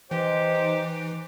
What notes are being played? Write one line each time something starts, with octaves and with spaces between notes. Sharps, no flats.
E3 D#4 G4 C5